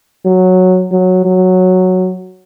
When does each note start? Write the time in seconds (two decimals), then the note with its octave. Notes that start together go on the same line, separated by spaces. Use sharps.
0.25 F#3
0.92 F#3
1.25 F#3